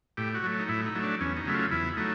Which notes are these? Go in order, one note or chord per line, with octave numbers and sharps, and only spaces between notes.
A2 G4
F#4
F#3 A3
D#4
A2 E4
D#4
F#3 A3
D4
E2 C#4
D#4
C#3 F#3 A3 E4
F4
E2 E4
F#3 A3 D#4